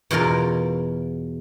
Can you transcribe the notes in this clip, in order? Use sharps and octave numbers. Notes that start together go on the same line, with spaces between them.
E2 B2 F4 A#4